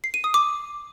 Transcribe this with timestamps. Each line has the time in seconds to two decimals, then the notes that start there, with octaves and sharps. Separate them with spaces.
0.04 C7
0.14 D#7
0.24 D#6
0.34 D6